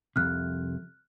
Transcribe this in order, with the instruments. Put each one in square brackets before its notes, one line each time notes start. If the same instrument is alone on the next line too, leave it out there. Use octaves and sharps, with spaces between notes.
[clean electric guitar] C2 F2 C3 [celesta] F6 F#6